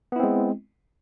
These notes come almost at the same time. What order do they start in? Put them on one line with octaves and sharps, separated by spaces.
B3 E4 C4 G#3